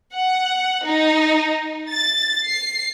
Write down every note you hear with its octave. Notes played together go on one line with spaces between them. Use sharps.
F#5
D#4
A6
C7